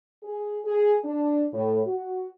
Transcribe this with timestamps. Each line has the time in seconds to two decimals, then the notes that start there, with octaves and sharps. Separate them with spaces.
0.23 G#4
0.65 G#4
1.03 D4
1.53 A2
1.85 F#4